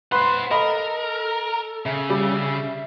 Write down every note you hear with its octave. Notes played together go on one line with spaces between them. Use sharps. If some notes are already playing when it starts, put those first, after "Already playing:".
B4 C5 F#5 C6
A4 A#4 D#5 B5
C#3 E5
G3